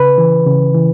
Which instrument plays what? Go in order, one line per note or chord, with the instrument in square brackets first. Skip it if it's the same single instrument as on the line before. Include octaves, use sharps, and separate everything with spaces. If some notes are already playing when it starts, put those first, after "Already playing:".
Already playing: [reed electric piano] C#3 B4
E3
C#3
E3